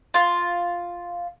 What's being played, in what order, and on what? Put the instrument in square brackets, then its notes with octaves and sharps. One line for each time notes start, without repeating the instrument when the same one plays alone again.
[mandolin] F4